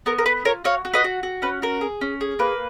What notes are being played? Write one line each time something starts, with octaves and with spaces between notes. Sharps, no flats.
B3 A#4
A#4
B3 B4
F4 A#4 C#5
F#4 C#5 F5
F#4
B4 D#5
F#4
F#4
C#4 B4
F#4 A#4
G#4
C#4
G#4
A#3 B4